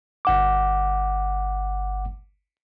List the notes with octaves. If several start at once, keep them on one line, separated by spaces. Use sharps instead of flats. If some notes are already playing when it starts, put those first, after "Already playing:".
G1 F#5 D6